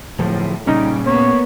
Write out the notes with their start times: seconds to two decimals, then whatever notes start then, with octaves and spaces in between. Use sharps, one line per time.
0.18 D1 A2 F3
0.67 A#2 C#3 G3 C#4 D#4
1.07 A#3 B3 C#5